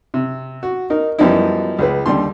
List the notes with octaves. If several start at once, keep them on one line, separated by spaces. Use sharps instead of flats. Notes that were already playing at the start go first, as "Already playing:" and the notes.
C3
F#4
D#4 A#4
F#2 F3 G3 B3 D#4 E4
C#2 G#3 B4
D#2 D3 G3 D4 C6